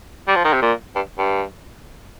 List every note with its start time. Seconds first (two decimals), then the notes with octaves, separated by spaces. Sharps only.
0.28 G3
0.36 F3
0.44 D#3
0.53 C3
0.62 A#2
0.96 G2
1.18 G2